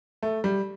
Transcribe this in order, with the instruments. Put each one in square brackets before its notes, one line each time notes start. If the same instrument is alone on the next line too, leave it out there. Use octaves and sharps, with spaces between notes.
[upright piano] A3
G3